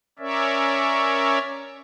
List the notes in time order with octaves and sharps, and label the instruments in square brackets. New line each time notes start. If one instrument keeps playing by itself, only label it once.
[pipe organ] C#4 A#4 C#5 D5 E5